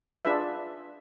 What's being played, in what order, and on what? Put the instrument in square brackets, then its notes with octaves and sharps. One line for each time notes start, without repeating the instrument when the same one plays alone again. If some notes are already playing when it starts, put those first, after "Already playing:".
[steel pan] D4 F4 G#4 B4 E5